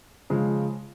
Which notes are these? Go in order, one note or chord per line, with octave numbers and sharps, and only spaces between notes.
C#3 F3 G#3